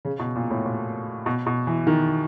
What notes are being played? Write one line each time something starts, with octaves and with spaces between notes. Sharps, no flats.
C#3
B2
A#2
A2
A#2
B2
B2
E3
D#3